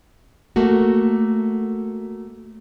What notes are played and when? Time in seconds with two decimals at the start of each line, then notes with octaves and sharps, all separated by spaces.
0.56 A3 A#3 F#4